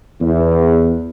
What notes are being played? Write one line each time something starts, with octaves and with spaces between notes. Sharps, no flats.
E2